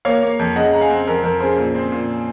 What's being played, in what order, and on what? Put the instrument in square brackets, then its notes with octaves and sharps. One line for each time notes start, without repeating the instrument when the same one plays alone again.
[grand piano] A#3 C#5 F5
A#3
F2
C#3 D#5 F#5
G#3 A#5
F5 G#5
C4
F2 A#4
F2 A#4
C#3 G#4 C5
A#2
C4
A#2